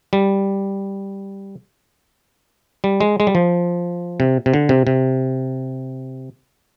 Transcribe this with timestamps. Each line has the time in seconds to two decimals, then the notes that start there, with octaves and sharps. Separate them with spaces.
0.13 G3
2.84 G3
3.00 G#3
3.20 G#3
3.27 G3
3.35 F3
4.20 C3
4.46 C3
4.54 D3
4.69 C3
4.87 C3